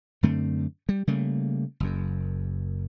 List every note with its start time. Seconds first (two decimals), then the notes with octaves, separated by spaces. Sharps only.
0.23 F#2 D3 A3 C4
0.89 G3
1.07 C#3 G3 A3 A#3
1.80 F#1 F#2